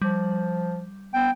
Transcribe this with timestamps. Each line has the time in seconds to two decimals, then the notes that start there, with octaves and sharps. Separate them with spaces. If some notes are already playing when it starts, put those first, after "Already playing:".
0.02 F3 G3
1.14 B3 G5